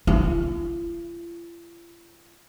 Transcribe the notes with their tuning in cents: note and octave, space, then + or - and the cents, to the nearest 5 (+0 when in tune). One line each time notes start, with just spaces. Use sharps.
F4 -45